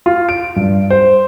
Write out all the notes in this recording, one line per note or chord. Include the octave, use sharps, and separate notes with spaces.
F4
D7
G2
C5